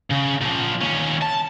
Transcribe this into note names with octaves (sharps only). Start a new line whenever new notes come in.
C#3
A#2 F3
D#2 C#4
A5